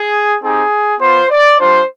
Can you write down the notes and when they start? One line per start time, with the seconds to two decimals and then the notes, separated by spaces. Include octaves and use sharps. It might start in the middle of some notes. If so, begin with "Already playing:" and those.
Already playing: G#4
0.42 C4 D#4 G4 G#4
1.00 B3 F4 C5
1.30 D5
1.59 G3 D4 F4 C5